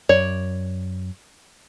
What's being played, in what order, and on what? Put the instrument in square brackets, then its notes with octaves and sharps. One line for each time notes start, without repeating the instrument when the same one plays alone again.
[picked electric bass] F#2 [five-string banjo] C#5 D5